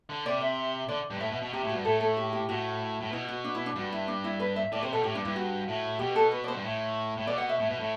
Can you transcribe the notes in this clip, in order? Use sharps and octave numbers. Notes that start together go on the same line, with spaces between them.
D3
C3 D5
E5
D3 D5
G2
B2
A2 E5
B2
B2
C3 G4
A2
F#4
G2
A2 A4
A4
G4
G4
A2 F#4
A2
B2 E4
F#4
D4
E4
D4
G2 F#4
E4
D4
E4
B4
E5
A2 D5
C3 C5
B2 A4
A2 G4
G2 D4
G2 E4
F#4
A2
B2 G4
A4
B4
D5
C5
G2
A2
A2
B2 D5
F#5
E5
A2
B2
A2